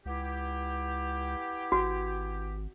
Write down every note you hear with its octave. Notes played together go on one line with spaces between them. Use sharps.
C#2 B3 E4 G4
G#1 F#4